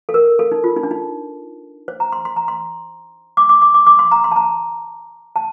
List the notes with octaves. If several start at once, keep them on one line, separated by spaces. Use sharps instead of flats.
A4
A#4
A4
D#4
F4
D#4
D4
D#4
C5
A#5
C6
C6
A#5
C6
D6
D6
D6
D6
D6
C6
A#5
C6
A5
A#5
A5